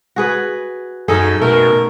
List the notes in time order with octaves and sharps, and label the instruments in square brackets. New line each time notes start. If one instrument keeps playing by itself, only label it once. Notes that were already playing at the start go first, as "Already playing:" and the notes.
[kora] F#4 G#4 B4
[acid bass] F#2 [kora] C#4 D#4 G#4 [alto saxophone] A4
[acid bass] B2 [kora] A3 [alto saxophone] A#4